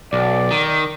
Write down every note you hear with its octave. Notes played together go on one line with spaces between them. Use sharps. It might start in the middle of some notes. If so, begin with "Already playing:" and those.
B1 D5
D#3